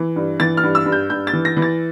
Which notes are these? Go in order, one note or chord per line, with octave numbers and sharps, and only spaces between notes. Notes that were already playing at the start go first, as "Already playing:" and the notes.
Already playing: E3
G2
E3 A6
F6
G2
E6
G2
G6
G2 G6
A6
E3
A#6
E3
A6